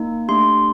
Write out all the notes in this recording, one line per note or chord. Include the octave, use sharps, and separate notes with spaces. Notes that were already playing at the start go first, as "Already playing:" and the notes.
Already playing: A#3 D#4
A3 D4 G4 C6